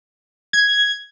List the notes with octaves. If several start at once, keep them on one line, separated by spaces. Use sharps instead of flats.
G#6